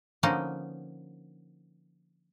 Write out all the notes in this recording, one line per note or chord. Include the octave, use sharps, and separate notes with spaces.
D3 F3 A#3 B3 C#4 D#4